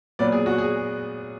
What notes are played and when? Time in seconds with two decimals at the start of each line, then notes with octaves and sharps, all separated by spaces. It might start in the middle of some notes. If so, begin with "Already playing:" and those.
0.19 A#2 F#3 B3 D5
0.32 G#4
0.46 F#4
0.58 G#4